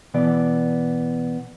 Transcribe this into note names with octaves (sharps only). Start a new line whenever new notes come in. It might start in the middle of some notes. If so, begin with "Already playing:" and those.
B2 E3 B3 D5